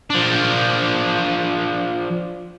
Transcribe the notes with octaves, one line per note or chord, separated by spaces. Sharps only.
F3 D4